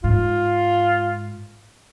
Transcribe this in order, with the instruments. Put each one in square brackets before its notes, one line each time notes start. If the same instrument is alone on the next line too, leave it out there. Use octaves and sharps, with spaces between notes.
[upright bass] G#2 [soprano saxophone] F4